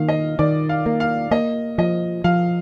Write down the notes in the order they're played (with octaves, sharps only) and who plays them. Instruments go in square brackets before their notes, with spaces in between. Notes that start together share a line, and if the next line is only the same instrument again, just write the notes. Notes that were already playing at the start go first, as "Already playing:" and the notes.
Already playing: [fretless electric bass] D#3 A#3 [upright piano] F5
[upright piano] D#5
[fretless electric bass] D#3 [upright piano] D5
[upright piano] F5
[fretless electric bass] A#3
[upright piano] F5
[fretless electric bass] A#3 [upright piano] D#5
[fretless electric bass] F3 [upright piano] D#5
[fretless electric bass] F3 [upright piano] F5